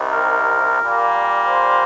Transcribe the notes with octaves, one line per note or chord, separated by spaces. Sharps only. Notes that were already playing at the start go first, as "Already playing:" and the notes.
Already playing: C2 C3 D#3
A#4
A#2 G3 A#3
C5